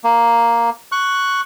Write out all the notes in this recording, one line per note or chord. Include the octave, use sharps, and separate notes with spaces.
A#3
C#6 F#6